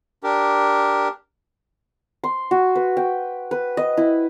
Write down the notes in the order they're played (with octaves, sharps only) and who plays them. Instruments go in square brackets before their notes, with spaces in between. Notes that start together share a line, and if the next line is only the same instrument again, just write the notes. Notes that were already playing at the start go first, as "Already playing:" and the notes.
[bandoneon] D4 G4 A#4
[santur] C6
F#4
B4
G5
B4
D#5
E4